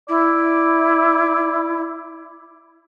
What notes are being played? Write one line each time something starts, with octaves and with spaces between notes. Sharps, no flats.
E4 D5